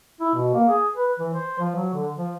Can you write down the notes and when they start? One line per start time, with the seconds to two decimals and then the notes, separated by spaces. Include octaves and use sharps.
0.21 E4
0.34 B2
0.54 A#3
0.69 G#4
0.95 B4
1.19 E3
1.34 C5
1.59 F3
1.76 F#3
1.94 D3
2.16 F3